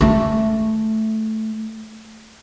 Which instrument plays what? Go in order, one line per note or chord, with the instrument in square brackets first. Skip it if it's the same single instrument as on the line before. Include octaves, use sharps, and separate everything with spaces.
[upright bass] A3 C#4